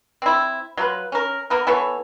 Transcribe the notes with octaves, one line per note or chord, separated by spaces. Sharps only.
C4 E4
F#3 F4 B4
C#4 A#4
A#3 B3 A#4
E3 B3 A4 C#5